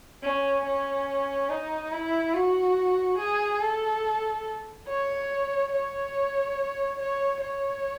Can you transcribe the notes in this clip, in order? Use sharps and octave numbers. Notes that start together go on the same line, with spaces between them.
C#4
C#4
D#4
E4
F#4
G#4
A4
C#5
C#5
C#5
C#5